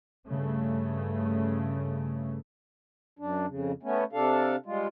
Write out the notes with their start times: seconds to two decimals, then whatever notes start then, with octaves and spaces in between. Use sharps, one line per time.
0.28 G2 C#3 A3
3.19 F#2 D4
3.47 F2 C#3
3.83 A3 B3 C#4
4.13 C3 D4 A4 F5
4.66 G3 G#3 F4